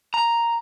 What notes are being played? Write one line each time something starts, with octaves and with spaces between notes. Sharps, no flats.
A#5